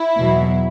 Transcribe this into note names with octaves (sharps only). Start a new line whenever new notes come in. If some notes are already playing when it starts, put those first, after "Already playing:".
Already playing: E4
E2 B2 F#3